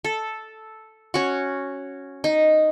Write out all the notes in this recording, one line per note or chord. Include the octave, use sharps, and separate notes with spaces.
A4
C#4 F#4
D#4